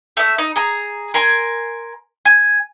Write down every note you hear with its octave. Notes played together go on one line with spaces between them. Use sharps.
A3 E5
D#4
G#4 A#5
A#4 G#5 C6
G#5